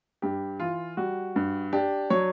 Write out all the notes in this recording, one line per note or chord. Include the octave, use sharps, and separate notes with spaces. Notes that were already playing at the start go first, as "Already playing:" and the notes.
G2 G4
E3 F4
G3 F#4
G2
D4 G4
F#3 C#5